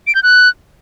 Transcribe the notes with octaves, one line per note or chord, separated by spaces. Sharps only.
D7
G6
F#6